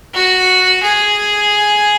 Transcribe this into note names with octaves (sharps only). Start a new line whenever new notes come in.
F#4
G#4